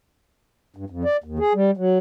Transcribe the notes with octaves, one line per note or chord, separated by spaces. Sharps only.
G2
F2
D5
D#2
G#4
G3
F#3